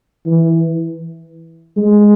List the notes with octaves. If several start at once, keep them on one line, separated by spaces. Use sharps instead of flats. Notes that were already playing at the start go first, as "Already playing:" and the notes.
E3
G#3